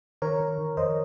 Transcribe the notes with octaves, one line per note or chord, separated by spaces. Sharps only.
D#3 A#4 C#5
D#3
D#3
F2 C5 D#5